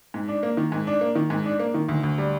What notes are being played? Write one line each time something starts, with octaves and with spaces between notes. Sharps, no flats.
G#2
D4
A#3
D#3
G#2
D4
A#3
D#3
G#2
D4
A#3
D#3
D2
D2
G3